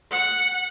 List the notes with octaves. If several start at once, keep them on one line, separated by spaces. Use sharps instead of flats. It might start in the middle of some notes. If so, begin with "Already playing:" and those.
F#5